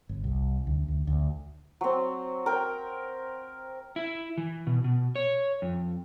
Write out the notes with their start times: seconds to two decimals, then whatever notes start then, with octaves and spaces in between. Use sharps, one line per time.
0.09 G1
0.24 C2
0.67 D2
0.88 D2
1.07 D2
1.81 F#3 C4
2.46 A#4 G5
3.96 E4
4.38 E3
4.67 B2
4.84 B2
5.16 C#5
5.62 F2